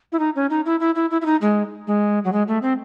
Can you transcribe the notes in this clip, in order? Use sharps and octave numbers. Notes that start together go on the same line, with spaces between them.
E4
D#4
C#4
D#4
E4
E4
E4
E4
E4
D#4
G#3
G#3
F#3
G#3
A3
C4